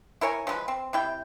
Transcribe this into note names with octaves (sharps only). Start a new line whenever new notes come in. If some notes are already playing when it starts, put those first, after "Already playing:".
E4 A#4 C#5 G#5
F3 G#3 G#4 B4
C4
C3 E4 G5